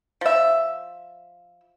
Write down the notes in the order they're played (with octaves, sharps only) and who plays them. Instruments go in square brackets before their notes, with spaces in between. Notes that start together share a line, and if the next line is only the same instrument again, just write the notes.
[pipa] F3 E5